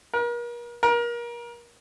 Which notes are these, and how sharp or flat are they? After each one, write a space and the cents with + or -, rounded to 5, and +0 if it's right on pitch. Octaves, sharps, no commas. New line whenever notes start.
A#4 +40
A#4 +30